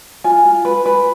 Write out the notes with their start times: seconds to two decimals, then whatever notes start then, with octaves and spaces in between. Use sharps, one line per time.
0.24 F4 G#5
0.45 F4
0.65 B4
0.86 B4